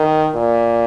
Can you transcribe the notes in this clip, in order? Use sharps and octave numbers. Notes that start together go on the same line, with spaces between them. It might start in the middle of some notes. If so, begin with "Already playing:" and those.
Already playing: D#3
A#2